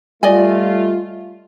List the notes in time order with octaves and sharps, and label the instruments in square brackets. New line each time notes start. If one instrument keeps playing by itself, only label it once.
[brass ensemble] G3 A3 F4 [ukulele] D5 D#5 G#5